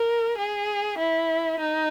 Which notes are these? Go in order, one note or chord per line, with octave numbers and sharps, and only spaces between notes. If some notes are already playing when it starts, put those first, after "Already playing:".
Already playing: A#4
G#4
E4
D#4